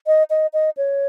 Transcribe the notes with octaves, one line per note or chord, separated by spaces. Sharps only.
D#5
D#5
D#5
C#5